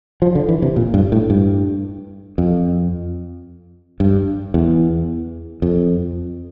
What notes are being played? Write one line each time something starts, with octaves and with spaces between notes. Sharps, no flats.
F3
D3
E3
C3
A#2
G2
A2
G2
F2
G2
E2
F2